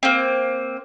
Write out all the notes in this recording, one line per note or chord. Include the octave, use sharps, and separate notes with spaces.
A#3 C4